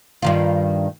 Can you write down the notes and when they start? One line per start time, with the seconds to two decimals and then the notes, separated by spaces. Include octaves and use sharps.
0.22 G2 D#3 F4